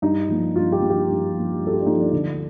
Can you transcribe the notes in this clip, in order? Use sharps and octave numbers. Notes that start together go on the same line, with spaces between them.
G2 D#4
F3 A#3
G2 F4
G4
F3 A#3
G4
G2
F3 A#3
G2
A4
G4
D4
F3 A#3 D#4
D4
D2 D4